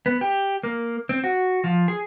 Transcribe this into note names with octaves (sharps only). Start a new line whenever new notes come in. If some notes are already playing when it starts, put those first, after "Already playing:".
B3
G4
A#3
C4
F#4
F3
G#4